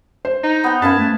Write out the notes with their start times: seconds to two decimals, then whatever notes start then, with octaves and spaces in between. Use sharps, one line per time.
0.25 C5
0.43 D#4
0.64 B3 G5
0.82 F#2 B4 F5 G#5 A5
0.99 A3